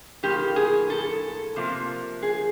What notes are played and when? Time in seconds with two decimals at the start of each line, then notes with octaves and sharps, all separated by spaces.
0.23 A2 F3 A#3 G4
0.56 G#4
0.90 A4
1.56 C3 F3 A#3
2.22 G#4